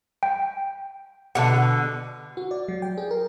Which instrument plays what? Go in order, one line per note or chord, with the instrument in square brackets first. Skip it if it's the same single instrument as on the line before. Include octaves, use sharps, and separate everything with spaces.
[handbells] G5
[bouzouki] B2 D3 [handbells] F#5 A5
[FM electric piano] F#4
D5
F#3
G5
G#4
A#4